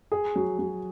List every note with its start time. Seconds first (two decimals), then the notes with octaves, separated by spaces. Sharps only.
0.12 G#4
0.36 F#3
0.59 F#3